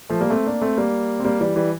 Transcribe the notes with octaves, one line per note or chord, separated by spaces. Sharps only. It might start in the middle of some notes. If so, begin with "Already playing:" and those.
F3 A3
G3 A#3
A3 C4
A#3 D4
A3 C4
G3 A#3
C4
G3 A#3
E3 G3
E3 G3